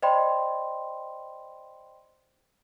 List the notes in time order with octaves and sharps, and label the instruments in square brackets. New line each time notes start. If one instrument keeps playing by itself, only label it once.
[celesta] C5 D5 D#5 G5 B5 C6